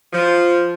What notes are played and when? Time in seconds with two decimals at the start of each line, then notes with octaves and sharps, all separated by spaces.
0.13 F3